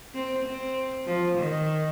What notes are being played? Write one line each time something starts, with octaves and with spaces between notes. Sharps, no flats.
C4
C4
F3
D#3